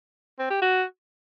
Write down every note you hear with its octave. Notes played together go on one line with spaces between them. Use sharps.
C4
G4
F#4